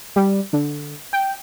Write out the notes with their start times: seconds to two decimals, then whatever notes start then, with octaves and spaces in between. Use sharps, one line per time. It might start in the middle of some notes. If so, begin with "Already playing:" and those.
0.16 G3
0.53 D3
1.13 G5